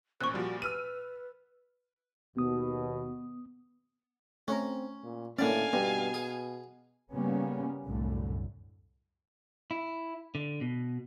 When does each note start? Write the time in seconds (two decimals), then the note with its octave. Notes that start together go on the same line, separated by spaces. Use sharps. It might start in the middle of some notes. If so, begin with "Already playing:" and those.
0.21 A1 A#2 C5 C#6 F#6
0.34 A#2 F3 G3 F#4
0.62 B4 E6 F6 D#7
2.37 D#2 B2 B3 D#6
4.48 A3 C4 C#4 C#5 A#5
5.04 A#2
5.39 A2 D3 A#3 C#4 D5 F5 G#5
5.73 G2 B2 B3
6.14 G#4
7.13 C#3 G3 A#3 B3 C#4
7.86 C2 F#2 A2 D3 A3
9.71 E4
10.35 D3
10.61 B2